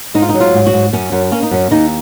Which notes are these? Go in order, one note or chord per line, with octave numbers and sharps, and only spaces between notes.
G#2 D#4
F4
D#4
F#3
F4
G#2
F#4
G#2
F#2 C#4
F#2
A#3 C#4
D#4
F#2 C#4
D#2 D#4